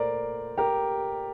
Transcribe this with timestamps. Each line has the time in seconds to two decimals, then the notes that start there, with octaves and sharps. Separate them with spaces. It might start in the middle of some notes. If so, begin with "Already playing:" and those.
Already playing: A#2 A3 A#4 C5 D5
0.57 G4 A#4